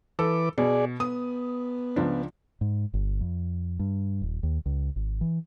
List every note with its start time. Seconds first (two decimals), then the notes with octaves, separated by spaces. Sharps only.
0.19 E3 A4 B4 D6
0.58 B2 G#4 D5
1.00 B3 D#6
1.96 C#2 F3 D4
2.61 G#2
2.94 G1
3.21 F2
3.79 G2
4.22 D#1
4.43 D#2
4.66 C#2
4.96 G#1
5.21 E3